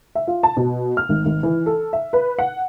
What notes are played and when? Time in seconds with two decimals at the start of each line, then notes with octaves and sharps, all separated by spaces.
0.15 E5
0.27 F4
0.43 A5
0.57 B2
0.97 F6
1.09 G#1
1.25 G#1
1.43 E3
1.66 A4
1.93 E5
2.13 B4
2.39 F#5